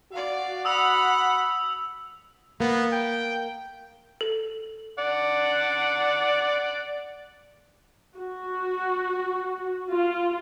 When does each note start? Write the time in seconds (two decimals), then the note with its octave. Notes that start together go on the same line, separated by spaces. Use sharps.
0.12 F#4 D5 F5
0.65 F#5 B5 D#6 E6 F7
2.60 A#3 B3
2.93 G5
4.21 A4
4.99 D5 F#5
8.17 F#4
9.90 F4